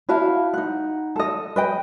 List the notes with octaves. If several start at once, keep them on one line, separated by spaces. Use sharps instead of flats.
E4 F#4 F5 A5
D#4 F#5
A4 D#5
B4 D#5 G5